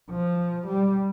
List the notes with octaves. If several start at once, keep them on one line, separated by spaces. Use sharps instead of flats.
F3
G3